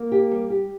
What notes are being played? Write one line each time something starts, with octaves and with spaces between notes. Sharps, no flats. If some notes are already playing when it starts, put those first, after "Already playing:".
Already playing: A#3
G4
G3
G4